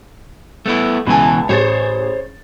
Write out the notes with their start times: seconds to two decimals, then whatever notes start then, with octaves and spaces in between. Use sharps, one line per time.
0.66 A3 B3 E4
1.07 C#2 B2 E3 G#5 A5
1.49 A1 G#4 C5 C#5 A6